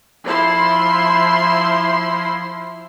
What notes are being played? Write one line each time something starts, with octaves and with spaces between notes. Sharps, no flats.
F3 E4 C6